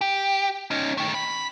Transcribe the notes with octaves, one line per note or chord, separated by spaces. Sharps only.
G4
C#4 D#4
D#3 A3
B5